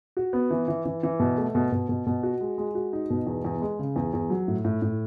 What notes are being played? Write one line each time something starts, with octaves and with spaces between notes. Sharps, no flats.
F#4
B3
E3
E3
E3
E3
B2
A3
B2
B2
B2
B2
F#4
G#3
G#3
F#4
D#4
B2
E2
E2
G#3
C#3
E2
E2
F#3
A2
A2
A2